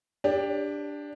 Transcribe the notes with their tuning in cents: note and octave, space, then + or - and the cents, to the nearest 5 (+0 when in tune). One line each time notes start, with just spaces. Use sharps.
D4 +0 G4 +20